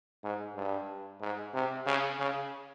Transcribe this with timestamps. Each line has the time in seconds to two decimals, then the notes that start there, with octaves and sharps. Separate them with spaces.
0.24 G#2
0.56 G2
1.21 G#2
1.54 C3
1.86 C#3
2.19 C#3